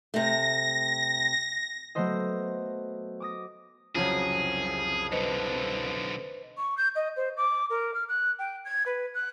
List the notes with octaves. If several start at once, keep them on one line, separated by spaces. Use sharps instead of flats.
C3 A3 A#6
F#3 A3 B3 C5 D#5
D6 D#6 A#6
C2 F2 C#3 F#3 G#4
B1 D3 B4 C5 D#5
C#6
G6
D#5
C5
D6
A#4
F6
F#6
G5
G#6
B4
F#6